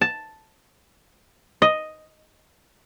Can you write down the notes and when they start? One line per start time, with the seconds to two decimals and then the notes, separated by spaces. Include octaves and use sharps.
0.01 A5
1.62 D#5